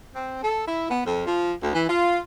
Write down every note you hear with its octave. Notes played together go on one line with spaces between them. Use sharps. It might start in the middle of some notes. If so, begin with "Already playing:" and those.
C4
A4
E4
B3
F2
F3
D2
E3
F4